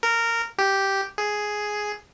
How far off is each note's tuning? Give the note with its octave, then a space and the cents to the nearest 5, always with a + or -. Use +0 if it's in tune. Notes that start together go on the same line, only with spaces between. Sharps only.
A#4 -15
G4 -5
G#4 +5